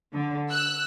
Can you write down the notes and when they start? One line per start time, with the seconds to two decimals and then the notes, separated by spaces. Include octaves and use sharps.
0.13 D3
0.50 E6 F#6